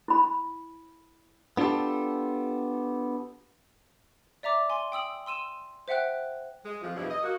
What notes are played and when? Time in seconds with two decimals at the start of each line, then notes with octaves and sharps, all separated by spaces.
0.08 E4 B5
1.57 B3 D4 F4 G4 A4
4.43 D5 E5 A#5 D6
4.70 G#5 C6
4.92 G5 D#6 E6 F#7
5.26 C6 E6 D#7 E7
5.88 C5 E5 F#5 G5 F#6
6.64 G#3
6.82 F2 F3
6.95 E2 G2 B2 F3 D4 E4
7.09 D#5
7.23 A#3 F#4